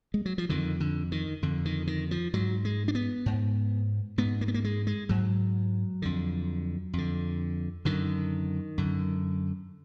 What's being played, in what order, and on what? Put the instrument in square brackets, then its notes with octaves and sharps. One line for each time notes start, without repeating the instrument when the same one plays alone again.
[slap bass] G#3
F#3
F3
F2 D3 D#3
D3
D#3
F2 D3
D#3
D#3
F3
G#2 F#3
G#3
D4
B3
G#2
G#2 B3
A#3
B3
A#3
G#3
G#3
G#2 F#3
F2 D3
F2 D3
F#2 D3 D#3
F#2 D3